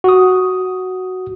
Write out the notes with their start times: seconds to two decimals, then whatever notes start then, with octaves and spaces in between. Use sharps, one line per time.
0.04 F#4 D#6